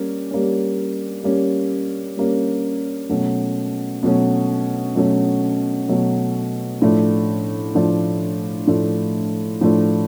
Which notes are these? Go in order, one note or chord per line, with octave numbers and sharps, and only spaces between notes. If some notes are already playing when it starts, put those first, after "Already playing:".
Already playing: G3 A#3 C#4
G3 A#3 C#4
G3 A#3 C#4
G3 A#3 C#4
B2 F#3 A3 C#4
B2 F#3 A3 C#4
B2 F#3 A3 C#4
B2 F#3 A3 C#4
A2 F3 A3 D4
A2 F3 A3 D4
A2 F3 A3 D4
A2 F3 A3 D4